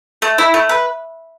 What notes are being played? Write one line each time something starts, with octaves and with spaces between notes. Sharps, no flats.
A3
E4
A3
B4